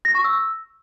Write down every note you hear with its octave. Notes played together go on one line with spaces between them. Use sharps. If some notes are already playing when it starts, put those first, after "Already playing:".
A#6
C#6
E6